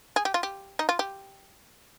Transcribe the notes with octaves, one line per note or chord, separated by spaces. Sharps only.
G#4
G4
F4
G4
D#4
F4
G4